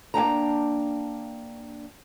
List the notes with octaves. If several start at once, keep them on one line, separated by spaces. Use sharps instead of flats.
A#3 D4 G5 A#5